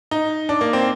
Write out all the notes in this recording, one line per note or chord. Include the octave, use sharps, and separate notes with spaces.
D#4
D4
A#3
C4